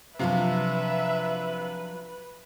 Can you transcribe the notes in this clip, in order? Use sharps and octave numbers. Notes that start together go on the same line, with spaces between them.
C3 F3 F#3 D4 F4 B4 E5